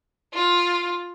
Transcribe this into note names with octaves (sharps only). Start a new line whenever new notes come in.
F4